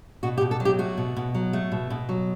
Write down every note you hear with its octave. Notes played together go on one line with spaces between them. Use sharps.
B2 F#4
G4
B2
A4
F#3
G4
A3 F#4
B2
B2
F#3
A3
B2
B2
F#3